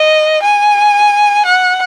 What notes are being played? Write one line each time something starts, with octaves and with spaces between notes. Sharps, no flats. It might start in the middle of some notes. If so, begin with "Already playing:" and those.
Already playing: D#5
G#5
F#5